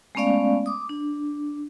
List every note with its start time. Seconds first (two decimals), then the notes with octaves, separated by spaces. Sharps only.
0.15 G#3 A3 B3 C#4 D5 F5
0.66 D6 D#6
0.89 D4